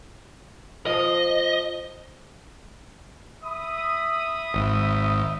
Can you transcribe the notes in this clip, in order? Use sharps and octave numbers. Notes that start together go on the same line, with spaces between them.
F3 D#5
E5 B5 D#6
G#1